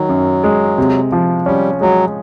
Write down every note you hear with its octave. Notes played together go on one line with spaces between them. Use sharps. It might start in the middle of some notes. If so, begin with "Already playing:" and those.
Already playing: D#3 F#3
F#2
G#3
C3
F3
G3 C#4
F#3 G#3